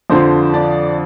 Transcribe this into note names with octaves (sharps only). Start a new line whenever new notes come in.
F2 D3 F3 C5
D4 D5